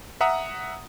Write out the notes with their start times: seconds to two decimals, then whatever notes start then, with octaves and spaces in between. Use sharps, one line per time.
0.21 E5 F#5 A#5 D#6